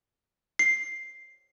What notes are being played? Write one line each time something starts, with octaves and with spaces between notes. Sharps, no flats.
C7